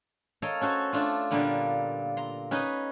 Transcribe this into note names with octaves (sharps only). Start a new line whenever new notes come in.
A4 A#4 C#5 D#5 F5
C#4 F#4 A4 C5
A3 D4 F4
A#2 D3 G3 A#3 B3
A#5 C6
C#4 D#4 B4 D#5